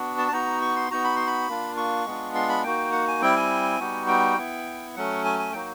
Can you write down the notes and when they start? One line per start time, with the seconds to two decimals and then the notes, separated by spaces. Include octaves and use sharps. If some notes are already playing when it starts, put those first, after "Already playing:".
Already playing: B3 D4 F#4
0.18 A5
0.28 A5
0.32 B3 D#4 F#4 A#5
0.62 C#6
0.76 C6
0.91 B3 D#4 F#4 A#5
1.04 B5
1.16 C6
1.27 B5
1.48 A#3 D4 F4
1.77 C#6
2.06 G#3 B3 D4 F4
2.35 C6
2.49 B5
2.64 A#3 D#4 F#4 G5
2.92 F#5
3.08 G#5
3.22 G3 C4 E4 G5
3.36 G#5
3.80 G3 B3 D#4 F#4
4.08 G5
4.38 B3 E4
4.96 F#3 A3 C#4 F#5
5.25 G#5
5.39 G#5
5.53 F#3 A#3 D#4 F#4 G5